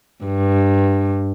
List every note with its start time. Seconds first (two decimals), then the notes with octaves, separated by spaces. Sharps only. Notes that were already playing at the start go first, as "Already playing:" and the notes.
0.24 G2